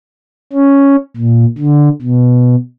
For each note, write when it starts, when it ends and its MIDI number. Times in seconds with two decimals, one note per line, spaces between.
0.53 0.96 61
1.16 1.45 46
1.58 1.89 50
2.02 2.55 47